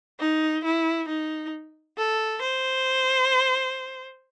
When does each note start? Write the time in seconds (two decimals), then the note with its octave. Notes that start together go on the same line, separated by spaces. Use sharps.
0.20 D#4
0.64 E4
1.08 D#4
1.98 A4
2.42 C5